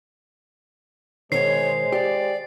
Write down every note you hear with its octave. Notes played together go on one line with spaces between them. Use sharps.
B2 D#3 G#3 C5 C#5 C7
G4 D5